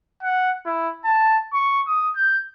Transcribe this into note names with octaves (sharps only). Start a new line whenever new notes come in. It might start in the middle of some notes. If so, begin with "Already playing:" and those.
F#5
E4
A5
C#6
D#6
G6